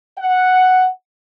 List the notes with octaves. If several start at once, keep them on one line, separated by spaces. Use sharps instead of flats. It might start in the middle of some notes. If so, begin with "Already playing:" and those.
F#5